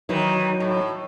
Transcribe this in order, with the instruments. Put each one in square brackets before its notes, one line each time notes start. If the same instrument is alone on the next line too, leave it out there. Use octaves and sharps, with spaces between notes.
[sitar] D#3 E3 [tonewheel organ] F#3 D#4
[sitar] A2